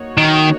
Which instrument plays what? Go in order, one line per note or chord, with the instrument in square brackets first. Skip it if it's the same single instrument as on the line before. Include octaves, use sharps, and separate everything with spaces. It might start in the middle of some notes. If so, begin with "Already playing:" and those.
Already playing: [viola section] A#3 D#4 F#4 C#5
[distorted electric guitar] D#3